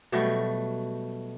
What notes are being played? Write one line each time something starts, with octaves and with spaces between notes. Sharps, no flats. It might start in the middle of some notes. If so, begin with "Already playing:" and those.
B2 F#3 G3 A3